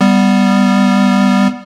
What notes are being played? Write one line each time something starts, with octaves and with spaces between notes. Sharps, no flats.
G3 B3